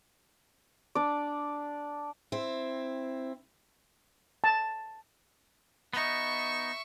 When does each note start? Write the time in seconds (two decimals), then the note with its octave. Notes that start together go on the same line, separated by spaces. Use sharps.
0.95 D4 D5
2.32 C4 E4
4.44 A5
5.93 B3 D#4 E5 C#6